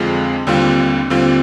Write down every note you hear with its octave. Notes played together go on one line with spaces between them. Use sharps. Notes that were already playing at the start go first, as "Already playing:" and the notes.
Already playing: F2 D3 G#3 C4 F4
D#2 D3 G3 C4 F4
D#2 D3 G3 C4 F4